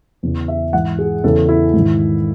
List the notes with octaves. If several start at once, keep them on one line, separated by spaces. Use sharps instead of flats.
E2 C#3 E3
E5
G#2 E3 F#5
G#4
E2 C#3 E3 A4
E4
G#2
D#3